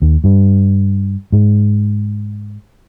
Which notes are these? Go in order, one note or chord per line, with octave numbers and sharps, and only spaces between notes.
D#2
G2
G#2